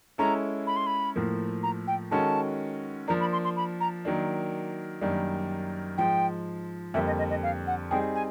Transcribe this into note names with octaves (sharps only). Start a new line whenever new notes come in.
G#3 C#4 E4 A4 A#5
B5
C6
B5
A2 F3 A#3
A#5
G5
D#3 G#3 C#4 F#4 A4 A5
F3 A#3 D4 A#5
B5
C6
C6
B5
A#5
D#3 F#3 A#3 D4
F#2 D#3 G3 A#3 D4
G#2 F3 G#3 G5
F2 D3 G3 A#3 E5
D#5
D#5
D#5
F5
F#5
G3 C4 D#4 G#4 G5
G#5